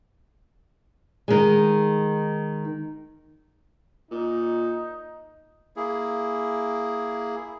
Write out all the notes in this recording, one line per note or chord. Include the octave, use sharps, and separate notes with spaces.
D#3 G#3
A#2 D#4
A#3 E4 G#4